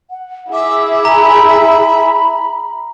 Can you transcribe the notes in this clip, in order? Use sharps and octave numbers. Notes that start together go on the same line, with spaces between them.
F#5
E4 G#4 E5 D6
A#5 B5